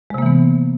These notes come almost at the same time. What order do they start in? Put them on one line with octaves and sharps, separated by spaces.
G#3 C3 A#3 E3 B3